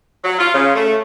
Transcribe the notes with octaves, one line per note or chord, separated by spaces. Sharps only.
F#3
F4
C#3
A3